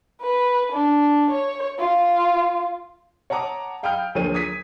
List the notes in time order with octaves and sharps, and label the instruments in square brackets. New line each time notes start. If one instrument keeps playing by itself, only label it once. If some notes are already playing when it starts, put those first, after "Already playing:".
[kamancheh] B4
D4
C#5
F4
[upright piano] C#5 F#5 A5 A#5 D6 D#6
F5 G5 B5 D#6 F6 G6
D2 F3 A#3 G#4 C#5 D#7
D6 D#6 G#6 A#6 B6 D#7